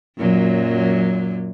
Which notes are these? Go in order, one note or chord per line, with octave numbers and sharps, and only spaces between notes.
F#2 A#2 F#3